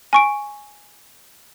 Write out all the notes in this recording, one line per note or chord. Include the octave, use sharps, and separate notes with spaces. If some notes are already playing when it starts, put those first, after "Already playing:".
G#5 C#6 D7